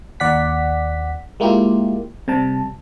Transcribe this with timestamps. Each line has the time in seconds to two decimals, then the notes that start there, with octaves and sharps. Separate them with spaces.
0.20 D#2 D5 F#5 B6
1.40 G#3 A#3 E4 F4 G4
2.28 C3 G3 A5